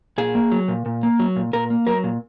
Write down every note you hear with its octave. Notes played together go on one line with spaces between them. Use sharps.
A#2 G#4
A#3
F#3
A#2
A#2
A#3
F#3
A#2
A#2 A#4
A#3
F#3 A#4
A#2